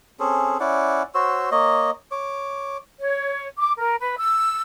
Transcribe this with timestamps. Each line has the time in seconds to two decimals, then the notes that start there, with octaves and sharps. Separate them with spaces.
0.20 C4 C#4 G#4 A4
0.60 C#4 E4 D5 F#5
1.15 F#4 C5 C#5 E6
1.51 A#3 C#5 D#5
2.11 C#5 D6
2.99 C#5
3.58 D6
3.78 A#4
4.00 B4
4.19 E6